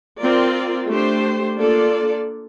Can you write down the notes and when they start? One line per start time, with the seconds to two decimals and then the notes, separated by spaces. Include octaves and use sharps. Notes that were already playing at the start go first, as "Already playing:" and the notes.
0.20 C4 F4 A#4 D5
0.89 A3 D4 G4 C5
1.57 A#3 D4 F4 A4 D5